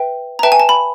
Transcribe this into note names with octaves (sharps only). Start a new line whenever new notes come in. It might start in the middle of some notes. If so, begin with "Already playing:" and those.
Already playing: B4 E5 G5
A#5
B4 E5 G5 A5
G#5
A5
B5